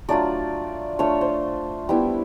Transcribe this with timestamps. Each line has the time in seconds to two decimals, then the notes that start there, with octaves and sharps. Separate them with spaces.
0.09 F#3 A3 D4 F4 D5
0.99 A3 D4 F4 C#5
1.21 C5
1.89 G3 B3 E4